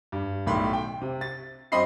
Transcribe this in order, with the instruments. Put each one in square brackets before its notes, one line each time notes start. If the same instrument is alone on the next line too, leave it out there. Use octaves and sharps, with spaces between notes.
[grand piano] G2
B1 A2 D#3 B5 C6
G5
C3
A6
F#2 C4 D#5 B5 C6 C7